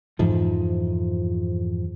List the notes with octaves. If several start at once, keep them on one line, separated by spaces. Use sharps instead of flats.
F2 G#2 E3 F3